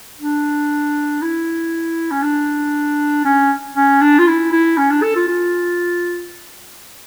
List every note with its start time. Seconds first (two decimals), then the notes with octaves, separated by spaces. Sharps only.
0.21 D4
1.22 E4
2.11 C#4
2.23 D4
3.25 C#4
3.76 C#4
4.01 D4
4.19 F4
4.27 E4
4.52 E4
4.78 C#4
4.91 D4
5.02 A4
5.16 F4
5.28 F4